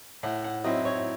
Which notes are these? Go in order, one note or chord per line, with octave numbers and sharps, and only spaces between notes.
A2 F#5
F#5
F#3 C4 E4 D#5
C#5